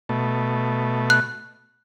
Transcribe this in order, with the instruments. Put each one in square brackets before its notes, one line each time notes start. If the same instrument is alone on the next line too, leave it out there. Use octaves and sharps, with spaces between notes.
[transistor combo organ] B2 A3
[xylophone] F#6